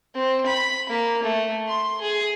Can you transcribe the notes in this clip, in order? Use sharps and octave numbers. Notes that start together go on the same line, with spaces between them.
C4
B5
A#3
A3
C6
G#4